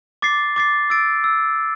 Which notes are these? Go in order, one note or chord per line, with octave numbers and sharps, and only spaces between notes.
D6 A6 C7
D6 A6 C7
E6 A6 D7
E6